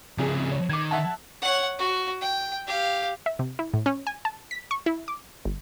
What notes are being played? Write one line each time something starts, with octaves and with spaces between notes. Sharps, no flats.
C2 C#3 F3 G#4
C#5
D#3 D6 G#6
E5 F#5 A5
C#5 F#5
F#4
G5
G4 F5
E5
C3
E4
A2
C#4
G#5
A5
B6
C#6
E4
D6
G1